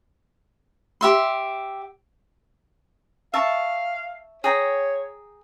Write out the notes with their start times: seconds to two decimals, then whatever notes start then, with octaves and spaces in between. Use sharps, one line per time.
1.01 G4 E5 C6
3.34 E5 F5 A5 C#6
4.44 G#4 C#5 G5 A#5